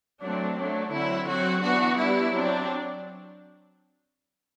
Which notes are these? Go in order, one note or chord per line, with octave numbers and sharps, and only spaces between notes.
F#3 A3 C4 D4
F#3 A3 D4
D3 F#3 C4 E4
F#3 C4 F#4
E3 B3 D4 F#4
G3 B3 D4 E4
F#3 C4 D4